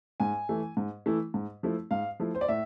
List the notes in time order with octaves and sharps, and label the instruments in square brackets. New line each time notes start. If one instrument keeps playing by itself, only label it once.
[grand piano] G#2 G#5
E3 A3 E4
G#2
E3 A3 E4
G#2
F3 A3 E4
G#2 F5
F3 A3 E4
C5
D5
A2 E5